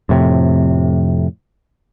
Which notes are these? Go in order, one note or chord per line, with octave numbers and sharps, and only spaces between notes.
F2 A2 C3